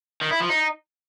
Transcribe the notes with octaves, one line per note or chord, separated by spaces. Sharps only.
D#3
E4
F3
D#4